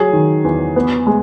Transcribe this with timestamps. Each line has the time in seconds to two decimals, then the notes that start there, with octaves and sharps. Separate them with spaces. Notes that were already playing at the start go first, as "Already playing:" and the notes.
Already playing: F#3 G#4
0.13 D#3
0.44 E2
0.76 B3
1.07 G#3